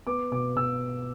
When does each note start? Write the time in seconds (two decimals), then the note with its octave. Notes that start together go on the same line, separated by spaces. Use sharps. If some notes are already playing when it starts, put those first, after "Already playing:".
0.07 B3 D6
0.31 B2 D6
0.56 B2 E6